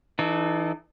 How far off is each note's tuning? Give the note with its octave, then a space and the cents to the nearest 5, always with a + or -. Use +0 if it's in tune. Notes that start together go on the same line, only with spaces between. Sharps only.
E3 +0 D#4 -40 A4 -25